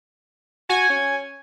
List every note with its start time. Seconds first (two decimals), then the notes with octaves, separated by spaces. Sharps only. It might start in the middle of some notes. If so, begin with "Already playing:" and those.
0.69 F#4 G#5
0.90 C#4